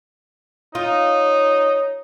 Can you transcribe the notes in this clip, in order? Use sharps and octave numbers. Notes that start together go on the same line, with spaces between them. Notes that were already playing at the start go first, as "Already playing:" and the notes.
D#4 F4 C#5